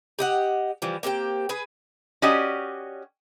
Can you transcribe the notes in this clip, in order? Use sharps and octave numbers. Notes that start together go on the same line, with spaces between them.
G4 D#5 F#5
E3 F3 G3
A#3 C4 G4 G5
G#4 B4
C#4 F#4 G4 D5 D#5